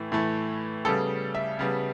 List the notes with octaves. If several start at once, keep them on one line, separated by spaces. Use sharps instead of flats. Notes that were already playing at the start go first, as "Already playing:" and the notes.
Already playing: A2 E3 A3
A2 E3 A3
C#3 G3 B3 A4
E5
C#3 G3 B3